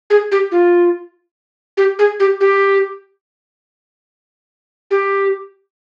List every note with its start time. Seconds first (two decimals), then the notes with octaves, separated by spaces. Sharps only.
0.10 G#4
0.32 G4
0.52 F4
1.77 G4
1.99 G#4
2.20 G4
2.41 G4
4.91 G4